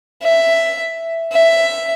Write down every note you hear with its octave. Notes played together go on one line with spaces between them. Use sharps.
E5
E5